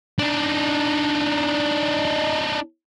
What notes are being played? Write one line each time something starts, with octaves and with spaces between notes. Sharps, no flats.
D4 D#4